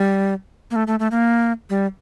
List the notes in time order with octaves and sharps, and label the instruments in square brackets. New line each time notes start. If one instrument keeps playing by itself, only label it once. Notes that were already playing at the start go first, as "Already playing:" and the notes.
Already playing: [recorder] G3
A#3
A3
A3
A3
A#3
G3